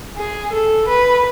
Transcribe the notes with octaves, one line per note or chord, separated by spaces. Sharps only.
G#4
A4
B4